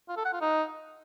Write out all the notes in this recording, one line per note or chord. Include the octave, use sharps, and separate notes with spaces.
F4
A4
F#5
F4
D#4